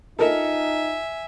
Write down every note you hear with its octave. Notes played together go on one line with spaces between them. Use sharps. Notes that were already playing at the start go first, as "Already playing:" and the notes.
D#4 F4 A4 A#4 D#5 E5 G#5